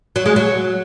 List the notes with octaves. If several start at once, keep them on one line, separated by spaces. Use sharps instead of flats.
F#3
G#3
F#3